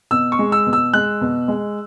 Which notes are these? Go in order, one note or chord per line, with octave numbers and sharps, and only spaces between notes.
B2 E6
C#6
G#3
E6
B2
E6
G#3 F#6
B2
G#3